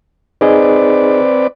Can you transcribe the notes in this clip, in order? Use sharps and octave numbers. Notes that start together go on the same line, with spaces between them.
C4 D#4 G#4 B4 D5 D#5